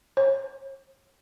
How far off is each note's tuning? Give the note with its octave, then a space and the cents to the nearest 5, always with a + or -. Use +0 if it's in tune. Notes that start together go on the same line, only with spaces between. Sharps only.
C#5 -40